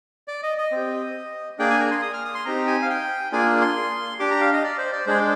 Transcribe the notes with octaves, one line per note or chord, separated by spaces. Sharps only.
D5
D#5
D#5
C4 G4
A#3 D4 G#4 G5
G#5
A#5
C6
D#6
F6
D#6
C6
C4 D#4 G4 A#5
G#5
F5
G5
A#3 D4 F4 G#4 G#5
C6
D4 G4 D6
A#5
F5
D#5
D5
C5
D5
G#3 D4 G#4 C5